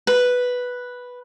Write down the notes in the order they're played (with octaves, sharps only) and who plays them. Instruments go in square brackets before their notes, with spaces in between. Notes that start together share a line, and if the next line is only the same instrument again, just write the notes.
[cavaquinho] B4